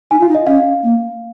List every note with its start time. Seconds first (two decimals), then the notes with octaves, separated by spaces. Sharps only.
0.11 D#4 G#5
0.20 F4 F5
0.29 D#4
0.35 D#5
0.46 C#4 F5
0.83 A#3